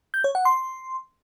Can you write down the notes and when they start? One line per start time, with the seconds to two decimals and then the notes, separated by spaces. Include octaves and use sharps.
0.14 G6
0.24 C#5
0.35 F#5
0.45 C6